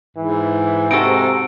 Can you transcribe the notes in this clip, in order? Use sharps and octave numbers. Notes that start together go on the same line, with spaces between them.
G#2 E3
G#2 C3 D#4 F#4 A4 D7